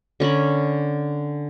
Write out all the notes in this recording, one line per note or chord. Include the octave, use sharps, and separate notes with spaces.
D3 C#4 A#4 B5